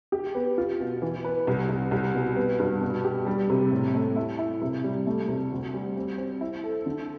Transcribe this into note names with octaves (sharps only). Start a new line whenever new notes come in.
G4
B3
F4
B2
E3
B4
C2
C2
C2
B2
B3
G2
B2
G4
G3
C3
A2
A3
E4
E4
C3
G3
A3
C3
D2
G3
C4
C4
E4
A4
D3